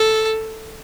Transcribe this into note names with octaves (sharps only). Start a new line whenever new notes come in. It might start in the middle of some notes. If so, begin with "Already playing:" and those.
Already playing: A4